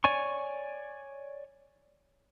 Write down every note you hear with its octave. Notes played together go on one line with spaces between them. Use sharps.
C#5 D5 G#5 C#6